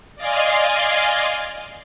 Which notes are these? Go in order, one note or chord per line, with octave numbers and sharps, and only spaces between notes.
D5 D#5 F5 G#5 C6